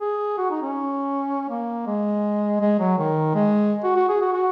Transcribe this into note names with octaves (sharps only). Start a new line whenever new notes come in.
G#4
F#4
D#4
C#4
A#3
G#3
G#3
F#3
D#3
G#3
F#4
F#4
G#4
F#4
F#4